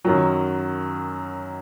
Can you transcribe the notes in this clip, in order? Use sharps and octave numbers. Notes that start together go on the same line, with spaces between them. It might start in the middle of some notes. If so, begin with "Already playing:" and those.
F#2 D#3 F#3